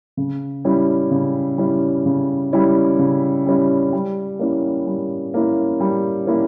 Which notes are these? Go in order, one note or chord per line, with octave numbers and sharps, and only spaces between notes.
C#3
G3 C#4 E4
C#3
G3 C#4 E4
C#3
G3 C#4 E4
C#3
G3 C#4 E4
G3
A#3 C#4 E4
G3
A#3 C#4 E4
G3
A#3 C#4 E4